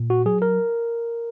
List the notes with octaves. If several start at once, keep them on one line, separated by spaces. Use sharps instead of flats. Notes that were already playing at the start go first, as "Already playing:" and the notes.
Already playing: A#2
F#4
F#3 G#4
A#4